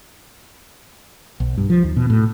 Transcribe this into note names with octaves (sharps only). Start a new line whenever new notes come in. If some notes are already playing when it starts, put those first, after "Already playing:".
B1
G2
F3
D#2
B2
A2